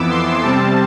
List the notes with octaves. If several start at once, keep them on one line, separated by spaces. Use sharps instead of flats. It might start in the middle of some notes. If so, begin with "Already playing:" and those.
Already playing: F2 E3 B3 D6 E6
C6
C3 G3 C4 A5